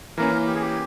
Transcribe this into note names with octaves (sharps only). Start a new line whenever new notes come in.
E3 A#3 C#4 A#4
G4
G#4
G4